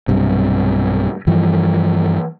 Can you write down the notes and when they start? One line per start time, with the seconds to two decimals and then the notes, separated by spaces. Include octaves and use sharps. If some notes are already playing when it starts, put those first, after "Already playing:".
0.08 B1 G2 C3
1.27 G2 E3 F3